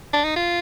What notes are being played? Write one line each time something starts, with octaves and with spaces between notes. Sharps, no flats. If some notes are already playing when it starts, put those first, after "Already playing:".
D4
D#4
F4